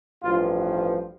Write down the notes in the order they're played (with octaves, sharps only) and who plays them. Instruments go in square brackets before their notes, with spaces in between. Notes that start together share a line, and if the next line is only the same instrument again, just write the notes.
[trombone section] A1 G2 F3 F4